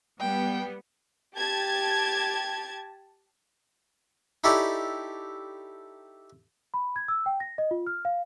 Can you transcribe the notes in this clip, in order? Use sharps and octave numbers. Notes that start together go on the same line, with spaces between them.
G3 B3 G5
G4 A5 G#6
D#4 E4 G4 A4 C#5 D5
B5
G#6
E6
G5
A#6
D#5
F4
F6
F5